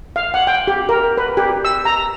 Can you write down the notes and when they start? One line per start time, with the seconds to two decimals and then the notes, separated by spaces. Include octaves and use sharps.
0.16 F5
0.34 F#5
0.47 G5
0.68 G4
0.89 A#4
1.18 B4
1.37 G4
1.65 E6
1.85 A#5